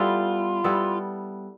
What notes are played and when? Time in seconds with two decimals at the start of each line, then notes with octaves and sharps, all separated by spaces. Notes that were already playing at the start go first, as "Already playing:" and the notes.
Already playing: G3 B3 E4 F4 A4
0.64 G3 B3 E4 A4